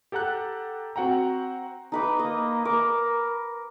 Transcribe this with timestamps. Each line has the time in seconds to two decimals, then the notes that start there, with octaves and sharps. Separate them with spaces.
0.12 G4 A4 F#5 A#5 F#6
0.96 C4 F#4 F#5 G5 A#5
1.92 D#4 B4 D6
2.19 A#3 D#5
2.65 A#4 D6